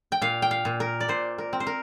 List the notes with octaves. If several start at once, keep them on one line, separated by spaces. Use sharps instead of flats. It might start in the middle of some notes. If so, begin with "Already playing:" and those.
G5
A#2 F5
G5
F5
A#2
A#4
D5
A#2 C5
A#4
C4
C5
A#4